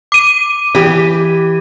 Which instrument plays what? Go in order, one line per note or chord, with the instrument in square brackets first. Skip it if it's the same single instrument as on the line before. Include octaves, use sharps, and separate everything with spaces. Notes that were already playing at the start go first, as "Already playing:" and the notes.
[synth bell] D6 D#7
[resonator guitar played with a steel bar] E3 G4